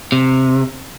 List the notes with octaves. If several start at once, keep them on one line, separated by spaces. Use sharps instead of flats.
C3